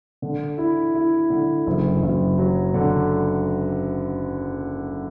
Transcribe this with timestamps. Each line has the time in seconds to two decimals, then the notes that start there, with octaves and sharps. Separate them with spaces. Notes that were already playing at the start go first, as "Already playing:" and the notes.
0.22 D3
0.58 E4
0.95 E4
1.30 D3
1.67 F#1
2.02 F#1
2.38 F#3
2.74 D3